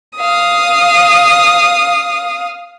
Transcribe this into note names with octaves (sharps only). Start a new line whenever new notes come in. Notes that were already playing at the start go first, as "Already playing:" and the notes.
F5 D#6